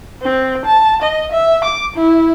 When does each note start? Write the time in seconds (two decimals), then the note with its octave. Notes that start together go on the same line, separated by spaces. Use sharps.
0.22 C4
0.65 A5
1.02 D#5
1.31 E5
1.64 D6
1.96 E4